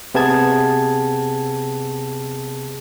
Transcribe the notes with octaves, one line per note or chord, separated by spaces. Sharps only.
C3 B3 G#4 A5 G#6